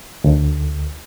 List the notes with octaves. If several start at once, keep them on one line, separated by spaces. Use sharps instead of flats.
D2